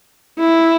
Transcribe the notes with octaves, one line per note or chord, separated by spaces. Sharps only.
E4